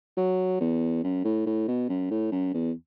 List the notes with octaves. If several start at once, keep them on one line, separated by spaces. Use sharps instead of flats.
F#3
E2
F#2
A2
A2
B2
F#2
A2
F#2
E2